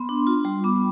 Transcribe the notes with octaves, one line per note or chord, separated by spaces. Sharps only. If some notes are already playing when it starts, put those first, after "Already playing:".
Already playing: B3 C6
D4
F4
G3
B3 D6